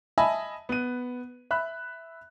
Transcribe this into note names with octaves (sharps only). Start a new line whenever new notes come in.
D#5 E5 G#5 A5 B5
B3 D#7
E5 B5 F#6